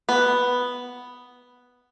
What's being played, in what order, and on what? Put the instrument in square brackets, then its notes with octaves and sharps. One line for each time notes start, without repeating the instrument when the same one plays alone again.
[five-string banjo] B3